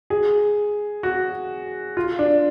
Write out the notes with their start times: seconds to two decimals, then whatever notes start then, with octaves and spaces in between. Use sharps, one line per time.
0.10 G#4
1.03 F#4
1.97 F4
2.19 D4